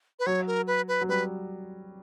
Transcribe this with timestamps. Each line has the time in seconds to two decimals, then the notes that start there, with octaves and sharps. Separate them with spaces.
0.19 B4
0.26 F#3 C#5
0.47 A#4
0.67 B4
0.88 B4
1.01 F#3
1.09 G3 B4